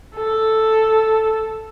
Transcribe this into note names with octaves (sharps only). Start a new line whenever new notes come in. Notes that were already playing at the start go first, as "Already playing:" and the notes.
A4